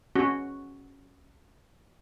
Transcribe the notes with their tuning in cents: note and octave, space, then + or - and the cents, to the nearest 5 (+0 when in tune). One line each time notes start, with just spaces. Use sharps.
C#4 +0 F#4 +0